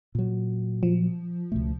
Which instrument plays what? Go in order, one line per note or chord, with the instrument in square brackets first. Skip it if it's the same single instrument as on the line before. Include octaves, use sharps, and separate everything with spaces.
[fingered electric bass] A#2 F#3
[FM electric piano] F3
[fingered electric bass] C#2 B2 A3